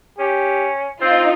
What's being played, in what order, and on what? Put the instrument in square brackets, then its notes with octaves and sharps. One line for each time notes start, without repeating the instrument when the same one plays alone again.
[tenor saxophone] C#4 [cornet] G4
[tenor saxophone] C4 [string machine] D#4 [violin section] F4 [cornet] C5